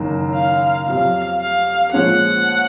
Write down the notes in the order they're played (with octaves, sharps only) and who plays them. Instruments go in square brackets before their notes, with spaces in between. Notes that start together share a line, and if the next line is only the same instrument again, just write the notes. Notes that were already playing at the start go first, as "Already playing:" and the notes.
Already playing: [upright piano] F#1 F#2 D#3
[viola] F5
[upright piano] F2 C3 F#3 [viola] F5
[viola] F5
[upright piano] A#2 F3 G#3 C#4 [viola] F#5